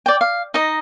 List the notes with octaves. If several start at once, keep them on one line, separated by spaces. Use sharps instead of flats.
D5 G5
F5
D#4 D#5